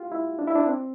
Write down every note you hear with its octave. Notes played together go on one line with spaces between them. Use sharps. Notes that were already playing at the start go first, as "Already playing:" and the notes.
Already playing: F4 G4
E4
D4
E4
D4
C4